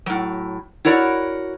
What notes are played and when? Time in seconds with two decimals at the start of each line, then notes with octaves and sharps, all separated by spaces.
0.06 A2 F#3
0.85 E4 F#4 A#4 C#5 D5